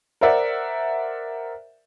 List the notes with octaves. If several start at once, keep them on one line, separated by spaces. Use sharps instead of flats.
A#4 C5 D5 E5 F#5